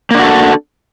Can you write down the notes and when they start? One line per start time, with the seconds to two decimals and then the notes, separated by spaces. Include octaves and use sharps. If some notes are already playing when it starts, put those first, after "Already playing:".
0.11 A#3
0.15 D4
0.19 F#4
0.23 A4